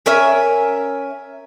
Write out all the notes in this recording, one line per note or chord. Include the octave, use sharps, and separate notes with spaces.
C#4 A#4 E5 G#5